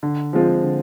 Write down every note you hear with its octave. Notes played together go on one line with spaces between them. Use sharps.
D3
F3 G#3 C4 F4
D3